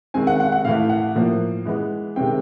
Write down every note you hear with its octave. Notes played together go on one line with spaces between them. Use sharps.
D#3 G#3 C4 G#5
F#5
F#5
F#5
A2 E3 A3 F5
F#5
A2 F3 A#3
E3 G#3 B3
C3 D#3 G#3 C4 G5